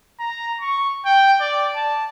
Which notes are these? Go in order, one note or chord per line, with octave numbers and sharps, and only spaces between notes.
A#5
C#6
G5
D5
A5